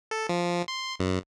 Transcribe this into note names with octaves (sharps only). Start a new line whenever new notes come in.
A4
F3
C6
F#2